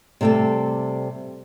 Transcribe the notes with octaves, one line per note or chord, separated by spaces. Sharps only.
C3 G3 A3 C4 A4